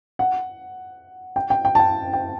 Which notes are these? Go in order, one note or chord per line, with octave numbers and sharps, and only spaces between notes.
F#5
G5
G5
G5
A5
G5
G5